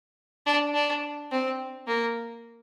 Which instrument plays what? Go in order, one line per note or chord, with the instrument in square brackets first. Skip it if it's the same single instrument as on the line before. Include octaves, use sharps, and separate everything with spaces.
[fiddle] D4
D4
C4
A#3